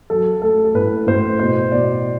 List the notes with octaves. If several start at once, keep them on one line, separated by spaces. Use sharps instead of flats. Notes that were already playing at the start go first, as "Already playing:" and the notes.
F#3 A4
A3 A4
A4
A2 B4
A2 C5
B2 C5
B2 D5